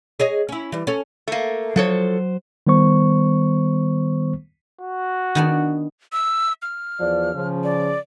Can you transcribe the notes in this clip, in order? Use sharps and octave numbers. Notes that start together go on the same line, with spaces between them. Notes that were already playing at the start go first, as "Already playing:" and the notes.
G#4 C#5 D#5
C#4 E4
E3 G3
C#4 A4
A3 A#3
F3 F#3 A4 C5 C#5
D#3 G3 B3 C5 C#6
F#4
D#3 B3 D4
E6
F6
E2 F3 D5
C#3 F3
D5